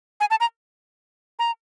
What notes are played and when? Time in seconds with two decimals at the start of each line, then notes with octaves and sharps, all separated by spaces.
0.20 G#5
0.31 A5
0.40 A#5
1.39 A#5